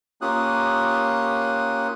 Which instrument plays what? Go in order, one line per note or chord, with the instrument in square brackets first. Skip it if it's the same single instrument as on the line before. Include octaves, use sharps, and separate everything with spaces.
[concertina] A#3 C#4 F4 G4 D#6 F#6